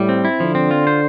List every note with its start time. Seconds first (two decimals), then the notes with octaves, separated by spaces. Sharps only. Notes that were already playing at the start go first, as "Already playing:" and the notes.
Already playing: A2 G3
0.09 C4
0.25 E4
0.40 D3 F3
0.55 C4
0.71 F4
0.87 C5